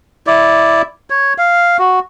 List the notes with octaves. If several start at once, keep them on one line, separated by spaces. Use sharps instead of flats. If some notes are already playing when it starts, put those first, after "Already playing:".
E4 D5
C#5
F5
F#4